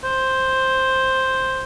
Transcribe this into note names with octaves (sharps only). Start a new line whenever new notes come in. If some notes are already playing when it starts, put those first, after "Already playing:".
C5